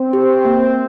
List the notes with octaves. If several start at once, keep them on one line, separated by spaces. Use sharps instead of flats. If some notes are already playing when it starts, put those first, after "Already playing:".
Already playing: C4
G4
A#3